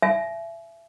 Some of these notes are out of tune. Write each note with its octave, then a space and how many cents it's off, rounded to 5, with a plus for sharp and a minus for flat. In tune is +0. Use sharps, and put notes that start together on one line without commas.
E5 +25 G#5 +40